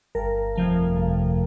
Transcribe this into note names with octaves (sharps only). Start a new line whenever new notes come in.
G1 A#4
F2 C3 F3 A3
G1